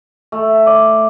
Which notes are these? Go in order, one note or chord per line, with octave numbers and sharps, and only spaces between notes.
A3
D5